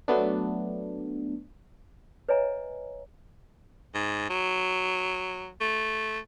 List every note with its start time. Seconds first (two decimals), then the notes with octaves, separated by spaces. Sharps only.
0.08 F#3 A3 B3 D4
2.29 B4 C#5 D#5 E5 G#5 A#5
3.95 G#2
4.30 F#3
5.61 A3